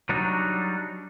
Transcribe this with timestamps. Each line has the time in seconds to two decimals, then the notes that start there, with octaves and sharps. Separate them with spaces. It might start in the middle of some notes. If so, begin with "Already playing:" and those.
0.09 F#3 G3 D4 D#4 F#4